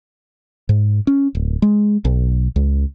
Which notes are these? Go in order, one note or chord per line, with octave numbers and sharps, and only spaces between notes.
G#2
C#4
D1
G#3
B1
C#2